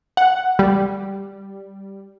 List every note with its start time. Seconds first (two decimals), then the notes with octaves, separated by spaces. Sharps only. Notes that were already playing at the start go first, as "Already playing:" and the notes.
0.17 F#5
0.59 G3